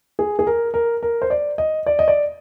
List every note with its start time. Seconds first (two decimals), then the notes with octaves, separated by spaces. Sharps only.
0.19 G#4
0.39 G#4
0.47 A#4
0.74 A#4
1.03 A#4
1.22 C5
1.30 D5
1.58 D#5
1.86 D5
1.99 D#5
2.08 D5